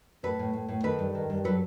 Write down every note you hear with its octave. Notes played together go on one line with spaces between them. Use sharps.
A2 A4 B4
A2
A2
A2
D#3 A4 B4
G2
D#3
G2
F#3 A4 B4